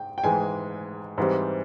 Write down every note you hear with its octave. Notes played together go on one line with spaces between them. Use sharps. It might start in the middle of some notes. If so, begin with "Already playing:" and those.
Already playing: G#2 G5
G5
G#2 E3 G#3 G#5
G#2 E3 G3 C4